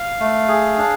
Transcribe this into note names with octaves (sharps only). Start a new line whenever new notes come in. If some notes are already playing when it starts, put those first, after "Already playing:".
Already playing: F5
A3
G#4
D4